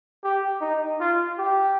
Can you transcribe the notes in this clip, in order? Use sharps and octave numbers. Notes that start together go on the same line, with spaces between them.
G4
D#4
F4
G4